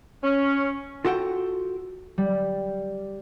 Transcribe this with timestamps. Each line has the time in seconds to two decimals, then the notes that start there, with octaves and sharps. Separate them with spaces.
0.24 C#4
1.05 F4 F#4 A4 F#5 G5
2.18 G3